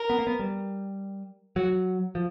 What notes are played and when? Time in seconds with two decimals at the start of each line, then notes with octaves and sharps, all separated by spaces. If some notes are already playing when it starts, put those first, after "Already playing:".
Already playing: A#4
0.10 B3
0.19 A#3
0.27 B3
0.39 G3
1.56 F#3 F#4
2.15 F3